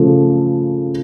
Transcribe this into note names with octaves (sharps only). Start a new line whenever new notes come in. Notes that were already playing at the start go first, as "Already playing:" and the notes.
Already playing: C#3 F3 A3